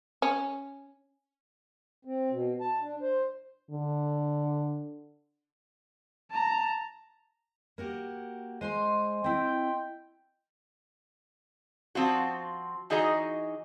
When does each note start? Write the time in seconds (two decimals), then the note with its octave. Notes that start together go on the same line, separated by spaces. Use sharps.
0.22 C#4
2.05 C4
2.31 B2
2.61 A5
2.81 D4
3.02 C5
3.71 D3
6.31 A5 A#5
7.78 A#3 F#4 G4
8.61 G#3 C5 D#5 G#5 C6
9.24 C4 E4 G5
11.95 F3 C4 F4 F#4
12.90 E3 D#4 F#4 G#4 D#5 A#5